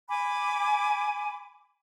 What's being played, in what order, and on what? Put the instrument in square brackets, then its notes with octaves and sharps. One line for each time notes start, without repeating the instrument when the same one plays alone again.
[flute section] G#5 B5 D6